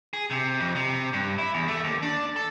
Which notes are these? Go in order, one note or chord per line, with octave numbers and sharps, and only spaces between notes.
G#4
C3
F2
C3
G2
E4
E2
A3
D#2
D4
A4